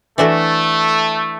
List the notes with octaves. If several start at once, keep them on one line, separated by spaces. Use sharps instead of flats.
E3 A3 D4 F#4 A4